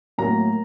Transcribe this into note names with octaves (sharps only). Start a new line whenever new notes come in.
A2 F#3 A#3 A#5